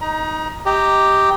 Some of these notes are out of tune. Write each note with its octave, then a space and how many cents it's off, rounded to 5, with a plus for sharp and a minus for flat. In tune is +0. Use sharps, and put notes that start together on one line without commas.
D#4 +0 A#5 +30
G4 +0 D#5 +20 A#5 -10